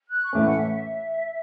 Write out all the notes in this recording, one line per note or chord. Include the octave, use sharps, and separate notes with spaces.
F#6
C#6
A2 E3 A3 C#4 D6
F#5
E5
E5